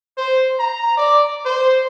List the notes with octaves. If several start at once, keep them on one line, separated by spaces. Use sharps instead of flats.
C5
A#5
D5
C5